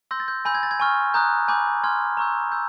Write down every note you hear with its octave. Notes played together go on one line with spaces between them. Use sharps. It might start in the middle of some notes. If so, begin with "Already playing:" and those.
C6 E6 G6 A#6
A6
G6
G#5 B5 E6 G6
G#6
A6
G#6
G#5 C#6 F6
A#5 D#6 F#6 G6
G#5 B5 D6 G6
G#5 C6 F6 G#6
A#5 C#6 E6 G6
E6 G6